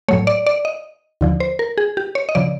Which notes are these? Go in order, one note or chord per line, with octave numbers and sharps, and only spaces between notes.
A2 F#3 A3 C#5
D5
D5
D#5
D#2 D3 F3
C5
A#4
G#4
G4
C#5
D#5
C#3 F3 D5